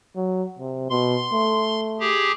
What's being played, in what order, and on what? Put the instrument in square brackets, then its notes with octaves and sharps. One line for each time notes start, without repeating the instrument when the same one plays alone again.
[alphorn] F#3
C3
[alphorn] B2 [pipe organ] C6
[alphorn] A3
[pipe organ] G4 G#4